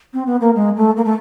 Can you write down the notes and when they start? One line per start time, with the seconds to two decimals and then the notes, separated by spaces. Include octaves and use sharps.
0.13 C4
0.26 B3
0.41 A#3
0.55 G#3
0.76 A3
0.97 A#3
1.04 A3